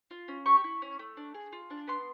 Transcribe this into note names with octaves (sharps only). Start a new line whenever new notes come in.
F4
C#4
G4 C#6
E4
C#4
A3
D4
G#4
F4
D4
B3 C6